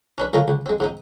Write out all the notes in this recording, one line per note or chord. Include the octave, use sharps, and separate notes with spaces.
C#4 D4 B4
C#2 D#3 A3 C#4 F4 A#5
C#2
G#3 C4
G#2 C4 D#4